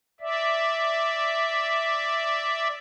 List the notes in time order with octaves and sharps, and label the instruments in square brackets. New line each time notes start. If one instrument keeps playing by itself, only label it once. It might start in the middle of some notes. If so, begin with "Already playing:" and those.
[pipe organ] D5 E5